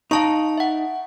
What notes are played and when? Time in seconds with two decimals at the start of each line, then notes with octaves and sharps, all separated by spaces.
0.11 D#4 F5 A5 C#6
0.57 E5 F#5